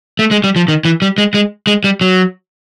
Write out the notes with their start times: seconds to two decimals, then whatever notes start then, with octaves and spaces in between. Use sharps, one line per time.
0.19 A3
0.31 G#3
0.44 G3
0.56 F3
0.68 D#3
0.85 E3
1.02 G3
1.18 G#3
1.34 G#3
1.67 G#3
1.84 G3
2.01 F#3